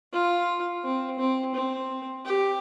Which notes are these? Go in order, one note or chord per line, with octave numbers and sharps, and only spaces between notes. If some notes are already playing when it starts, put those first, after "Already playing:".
F4
C4
C4
C4
G4